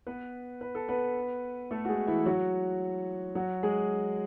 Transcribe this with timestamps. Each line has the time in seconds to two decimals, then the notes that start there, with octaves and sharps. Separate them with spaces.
0.07 B3 B4
0.61 B4
0.75 A4
0.89 B3 B4
1.71 A3 A4
1.85 F#4
1.89 G#3 G#4
2.07 E3 E4
2.26 F#3 F#4
3.35 F#3 F#4
3.63 G#3 G#4